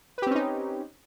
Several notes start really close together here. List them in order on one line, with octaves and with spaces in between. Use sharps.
B4 G4 C4 C#4 D#4